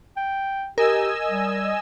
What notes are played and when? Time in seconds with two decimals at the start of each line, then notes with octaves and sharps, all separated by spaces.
0.17 G5
0.78 G4 A#4 D#5 G#5 E6
1.29 G3